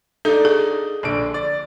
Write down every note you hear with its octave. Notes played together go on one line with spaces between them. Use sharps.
D4 D#4 A4
G#4
A#1 D3 D7
D5